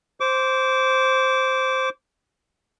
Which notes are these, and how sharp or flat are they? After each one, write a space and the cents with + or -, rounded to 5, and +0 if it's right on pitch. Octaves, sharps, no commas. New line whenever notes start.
C5 +0 D6 -25